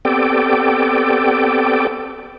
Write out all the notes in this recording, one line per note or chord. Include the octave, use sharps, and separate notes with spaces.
B3 C4 G4 A4 D5 G5